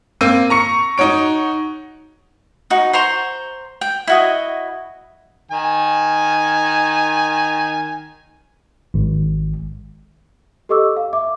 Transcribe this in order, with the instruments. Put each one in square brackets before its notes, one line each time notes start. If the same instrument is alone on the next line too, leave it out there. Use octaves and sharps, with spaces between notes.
[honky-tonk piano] A#3 C4 E6 D#7
A#5 C#6 C#7
D#4 F#4 C#5 D7
[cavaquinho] D#4 F#4
C5 A#5 C6 C#6
G5
E4 F#4 D#5
[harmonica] D#3 G#5
[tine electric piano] G#1
[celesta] G4 A4 D#5 C#6 D6 E6
F5
E5 D6